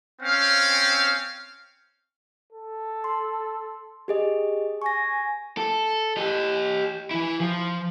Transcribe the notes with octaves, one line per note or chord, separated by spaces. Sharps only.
C4 C#4 F5
A4
C6
G4 G#4 D#5
G#5 C#6 A#6
A4
G4 D#5
E3 E4
F3